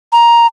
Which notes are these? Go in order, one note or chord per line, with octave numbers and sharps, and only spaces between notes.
A#5